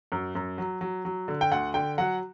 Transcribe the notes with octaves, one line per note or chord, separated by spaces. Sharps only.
F#2
F#2
F#3
F#3
F#3
D3
G5
D2 F#5
D3 G5
F#3 F#5